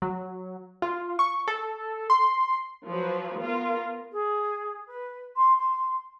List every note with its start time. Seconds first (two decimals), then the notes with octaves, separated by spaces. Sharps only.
0.02 F#3
0.82 F4
1.19 C#6
1.48 A4
2.10 C6
2.87 F3 F#3 B4
3.40 B3 F4 A#4
4.12 G#4
4.87 B4
5.36 C6
5.57 C6